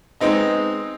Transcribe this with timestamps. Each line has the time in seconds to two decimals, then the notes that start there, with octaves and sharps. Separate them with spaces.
0.20 G#3 B3 C4 D#4 D#5